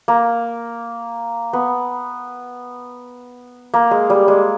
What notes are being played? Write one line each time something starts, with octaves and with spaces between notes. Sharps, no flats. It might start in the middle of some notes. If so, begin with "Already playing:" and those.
A#3
B3
A#3
G#3
G3
G#3